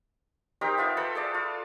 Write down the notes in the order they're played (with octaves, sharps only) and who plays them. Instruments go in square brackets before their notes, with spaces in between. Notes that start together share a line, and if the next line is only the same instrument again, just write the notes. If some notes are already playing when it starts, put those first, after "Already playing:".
[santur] C4 D#4 G4 A#4
B3 E4 F4 E5
A4 B4 C5 B5
G#4 A4 D5
F4